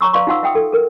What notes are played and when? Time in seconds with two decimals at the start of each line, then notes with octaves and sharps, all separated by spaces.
0.01 C#5 A#5 C#6 E6
0.13 B4 D5 F5 C6 C#6
0.27 D#4 F4 F5 F#5 C6 E6
0.43 E5 F#5 G5 D#6
0.55 A4
0.72 A4 A#4